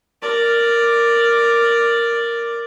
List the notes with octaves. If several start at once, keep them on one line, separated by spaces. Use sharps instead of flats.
A#4 D5